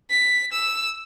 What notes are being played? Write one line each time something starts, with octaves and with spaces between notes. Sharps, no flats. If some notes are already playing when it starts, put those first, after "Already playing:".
B6
E6